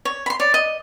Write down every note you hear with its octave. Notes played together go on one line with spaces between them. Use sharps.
C#5
B5 C6
C#5 D5
D#5